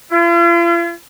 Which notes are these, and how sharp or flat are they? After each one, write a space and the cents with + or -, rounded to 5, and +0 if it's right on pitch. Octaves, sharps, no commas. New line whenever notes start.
F4 -45